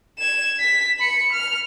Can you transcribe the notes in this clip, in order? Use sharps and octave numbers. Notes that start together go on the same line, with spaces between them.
G#6 E7
B6
B5 C#7
F6